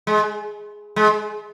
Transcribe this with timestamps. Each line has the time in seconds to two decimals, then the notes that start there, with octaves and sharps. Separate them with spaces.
0.07 G#3
0.96 G#3